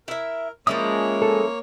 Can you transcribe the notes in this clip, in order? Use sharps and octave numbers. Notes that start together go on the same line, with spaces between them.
E4 A#4 E5
F3 G#3 A#3 C#4 E4 C#5 D#6
A4